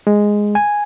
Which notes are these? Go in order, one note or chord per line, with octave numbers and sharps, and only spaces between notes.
G#3
G#5